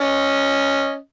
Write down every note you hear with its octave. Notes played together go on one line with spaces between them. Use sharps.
C#4 D#5